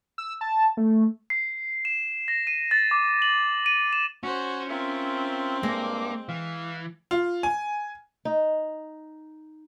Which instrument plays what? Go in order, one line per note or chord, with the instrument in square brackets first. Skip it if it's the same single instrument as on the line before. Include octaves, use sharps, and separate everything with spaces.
[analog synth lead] E6
A5
A3
[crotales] C7
E7
A#6
D#7
A6
D6
F#7
D#7
E7
[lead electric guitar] C#4 [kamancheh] F#4 C5
[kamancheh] C4 [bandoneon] F4 A#4 E5
[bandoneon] G2 D6 [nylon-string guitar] G#3 [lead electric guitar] A#3
[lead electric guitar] E3 [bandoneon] F5
[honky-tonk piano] F4
G#5
[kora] D#4